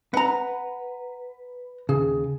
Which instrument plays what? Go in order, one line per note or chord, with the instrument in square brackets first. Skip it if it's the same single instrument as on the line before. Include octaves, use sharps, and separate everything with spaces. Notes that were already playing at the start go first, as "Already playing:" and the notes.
[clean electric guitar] B4 [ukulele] F#5 A#5
[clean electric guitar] D#2 C#3 [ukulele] G#4